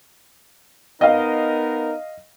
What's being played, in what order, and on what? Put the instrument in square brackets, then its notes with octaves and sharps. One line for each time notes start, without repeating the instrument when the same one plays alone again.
[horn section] B3 D#4 A#4 [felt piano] D#5 F5